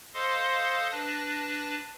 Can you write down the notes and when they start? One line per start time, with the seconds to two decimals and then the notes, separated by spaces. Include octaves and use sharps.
0.14 A4 C5 D#5 F5 C6 D#6
0.92 D4 B4 A5 A#6